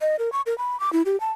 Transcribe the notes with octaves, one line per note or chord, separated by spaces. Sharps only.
D#5
A#4
C#6
A#4
B5
D6
E4
G4
A5